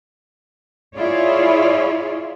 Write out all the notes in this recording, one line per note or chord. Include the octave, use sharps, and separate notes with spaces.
E4 F4 G#4 C#5 D5